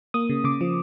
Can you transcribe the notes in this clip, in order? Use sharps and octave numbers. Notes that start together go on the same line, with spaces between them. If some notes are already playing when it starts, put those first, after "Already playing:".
A#3 D#6
C#3
C#3 D6
F3